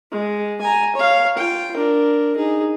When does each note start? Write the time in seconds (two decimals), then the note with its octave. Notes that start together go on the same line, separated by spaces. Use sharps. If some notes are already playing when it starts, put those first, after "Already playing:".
0.12 G#3
0.61 G#5 A#5
0.95 C#5 F5
1.37 F4 G5
1.76 D4 A#4
2.37 D#4 G#4